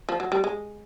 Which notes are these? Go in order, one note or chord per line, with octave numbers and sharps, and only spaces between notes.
F3
F#3
G3
G#3